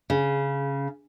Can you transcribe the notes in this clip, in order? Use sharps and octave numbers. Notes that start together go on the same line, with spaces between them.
C#3